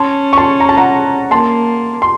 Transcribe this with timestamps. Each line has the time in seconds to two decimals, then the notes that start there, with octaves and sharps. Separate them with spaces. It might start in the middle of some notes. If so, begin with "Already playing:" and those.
Already playing: C#4 A5 C6
0.33 C#6
0.38 A5 C6
0.60 A#5
0.69 A5
0.77 F#5 A#5
1.31 A#3 A5 C6
2.02 C6